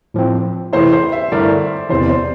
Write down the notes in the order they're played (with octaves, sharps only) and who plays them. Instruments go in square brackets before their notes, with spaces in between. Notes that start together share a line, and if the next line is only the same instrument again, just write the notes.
[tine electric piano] A2 F3 C4
[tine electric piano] C3 E3 A3 C4 E4 [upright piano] C5
[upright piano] C5
E5
[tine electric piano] G2 D3 A3 E4 A#4 [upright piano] D5
[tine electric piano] E2 C3 E3 [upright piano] C5
[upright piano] D5
C5